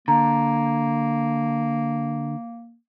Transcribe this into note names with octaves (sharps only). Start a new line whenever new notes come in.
D3 A#3 A#5